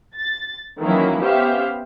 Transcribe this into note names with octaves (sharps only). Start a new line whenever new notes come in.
A6
D#3 E3 F#3 A#3 C#4 E4
B3 C#4 G4 C5 E5 F5